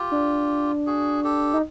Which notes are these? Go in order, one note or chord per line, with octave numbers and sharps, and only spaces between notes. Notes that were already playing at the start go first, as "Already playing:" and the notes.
Already playing: F4 G4
D4
F#4 G#4
G4 A4
D#4